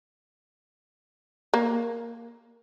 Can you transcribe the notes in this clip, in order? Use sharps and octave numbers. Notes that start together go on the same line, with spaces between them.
A#3